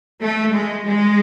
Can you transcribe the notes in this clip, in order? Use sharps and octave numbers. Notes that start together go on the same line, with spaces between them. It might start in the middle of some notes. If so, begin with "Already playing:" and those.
A3
G#3
G#3